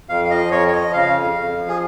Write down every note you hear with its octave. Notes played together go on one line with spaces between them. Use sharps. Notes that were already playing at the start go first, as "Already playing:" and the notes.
F2 F5
F5
F3 D#5
F2 C#5
C#5
F3 D#5
C#3 F5
F2
F2
F3
G#4